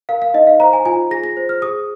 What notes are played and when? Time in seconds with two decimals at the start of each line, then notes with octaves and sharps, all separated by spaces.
0.09 A#4 F5
0.22 F5
0.34 D#4 D#5
0.47 F5
0.60 C5 A#5
0.73 G#5
0.85 F4 G#5
1.11 G#4 A#6
1.24 A#6
1.37 C5
1.49 F6
1.62 G#4 D#6